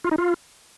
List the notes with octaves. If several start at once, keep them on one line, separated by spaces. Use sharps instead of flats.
F4
D#4
F4